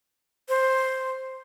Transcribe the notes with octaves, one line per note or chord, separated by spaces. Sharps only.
C5